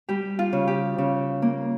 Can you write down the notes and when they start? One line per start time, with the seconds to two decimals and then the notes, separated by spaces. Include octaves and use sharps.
0.09 G3 G4
0.39 F4
0.53 C#3
0.67 G4
0.98 C#3
1.42 A#3